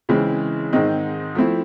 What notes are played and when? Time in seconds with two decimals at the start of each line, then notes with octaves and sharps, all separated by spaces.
0.09 C#3 E3 G#3 C4
0.73 G#2 D#3 G#3 C4 D#4
1.35 F3 A3 C4 E4